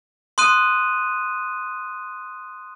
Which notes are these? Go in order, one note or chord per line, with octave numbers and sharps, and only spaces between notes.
C6 D#6 F#6 D#7